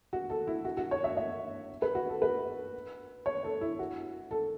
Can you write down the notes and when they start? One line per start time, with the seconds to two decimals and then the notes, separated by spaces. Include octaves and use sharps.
0.13 F#4
0.30 A4
0.47 E4
0.65 F#4
0.77 F#4
0.91 C#5
1.04 E5
1.17 E5
1.82 B4
1.95 F#4
2.09 A4
2.22 B4
3.26 C#5
3.44 A4
3.61 E4
3.79 F#4
4.31 A4